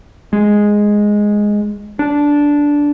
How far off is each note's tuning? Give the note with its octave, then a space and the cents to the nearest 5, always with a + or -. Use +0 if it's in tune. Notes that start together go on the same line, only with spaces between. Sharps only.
G#3 +0
D4 -10